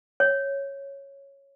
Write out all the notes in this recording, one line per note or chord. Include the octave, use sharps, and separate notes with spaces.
C#5